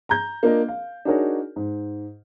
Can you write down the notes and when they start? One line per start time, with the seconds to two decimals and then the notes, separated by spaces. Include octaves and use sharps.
0.09 A#5 G6
0.43 A#3 D4 F4 A#4 D#5
0.68 F5
1.05 D4 D#4 F#4 G#4 A#4 C#5
1.56 G#2